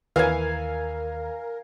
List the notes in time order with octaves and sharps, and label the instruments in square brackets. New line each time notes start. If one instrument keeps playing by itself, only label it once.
[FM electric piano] D#2 [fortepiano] E3 [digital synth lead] A#4 [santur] F5 G#5